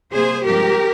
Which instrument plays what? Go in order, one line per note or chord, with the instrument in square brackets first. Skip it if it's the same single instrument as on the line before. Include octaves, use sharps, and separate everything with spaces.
[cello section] C3 G3 A#3 G#4 C5
G2 F3 G#3 C4 G4 A#4